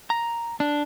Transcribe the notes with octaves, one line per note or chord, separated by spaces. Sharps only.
A#5
D4